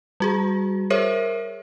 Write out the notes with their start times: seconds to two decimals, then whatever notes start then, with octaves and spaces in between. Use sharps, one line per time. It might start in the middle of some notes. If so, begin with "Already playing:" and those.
0.20 G3 F#4 G#4
0.90 G#4 A#4 C5 C#5 E5